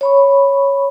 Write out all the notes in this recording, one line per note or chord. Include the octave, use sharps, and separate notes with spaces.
C#5 B5 C#6